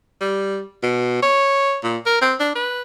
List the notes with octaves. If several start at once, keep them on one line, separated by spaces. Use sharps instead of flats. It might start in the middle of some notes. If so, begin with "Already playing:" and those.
G3
B2
C#5
A#2
A#4
C4
D4
B4